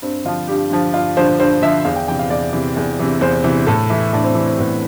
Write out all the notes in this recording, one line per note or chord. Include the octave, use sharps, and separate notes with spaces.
G2 C4
D3 F3 F4
G2 G4
D3 F3
G2 F4
D3 F3 C5
G2 C5
D3 F3 E5
E2 F5
G5
C3 E3 G5
F5
E2 D5
C3 E3
E2
C3 E3
E2 C5
C3 E3
A2 A4
E3 E4
A2 D4
C4
E3 D4
C4
A2 B3